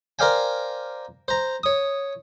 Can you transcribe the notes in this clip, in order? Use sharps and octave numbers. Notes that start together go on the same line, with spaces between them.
A#4 C5 D5 F5 G5 G#5
C5 A#5
C#5 D#6